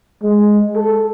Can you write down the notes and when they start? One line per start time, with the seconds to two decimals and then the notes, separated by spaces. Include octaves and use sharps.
0.23 G#3
0.76 A4